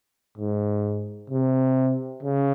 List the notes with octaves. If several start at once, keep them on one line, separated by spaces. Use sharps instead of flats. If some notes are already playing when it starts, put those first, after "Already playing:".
G#2
C3
C#3